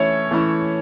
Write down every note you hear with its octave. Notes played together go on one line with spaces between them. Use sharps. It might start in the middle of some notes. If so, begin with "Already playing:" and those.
Already playing: E3 A3 C#4 E4 C#5
E3 A3 C#4 E4